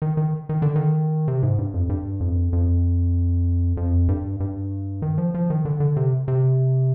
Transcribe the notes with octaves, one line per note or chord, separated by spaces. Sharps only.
D#3
D#3
D#3
D3
D#3
C3
G#2
G2
F2
G2
F2
F2
F2
G2
G2
D#3
F3
F3
D#3
D3
D3
C3
C3